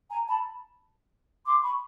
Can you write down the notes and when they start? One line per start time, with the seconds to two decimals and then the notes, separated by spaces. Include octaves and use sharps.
0.10 G#5 A#5
0.27 A5 B5
1.45 C6 D6
1.62 B5 C#6